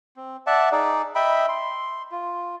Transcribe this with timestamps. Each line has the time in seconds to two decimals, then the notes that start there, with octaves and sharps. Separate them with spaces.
0.16 C4
0.47 D5 E5 F#5 A5
0.72 D#4 G#4 D5
1.15 D#5 E5 G5 B5
1.49 C6
2.11 F4